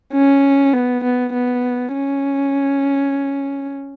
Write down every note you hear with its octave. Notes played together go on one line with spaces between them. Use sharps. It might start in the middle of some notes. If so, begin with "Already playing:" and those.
C#4
B3
B3
B3
C#4